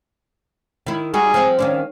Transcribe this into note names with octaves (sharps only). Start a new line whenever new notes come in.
D#3 E4
G3 D#4 F#4 G#4
F3 C4
D#3 C#4 D4 F5